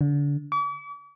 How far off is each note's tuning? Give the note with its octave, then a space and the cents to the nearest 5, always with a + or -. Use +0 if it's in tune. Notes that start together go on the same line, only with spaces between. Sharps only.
D3 -30
D6 -45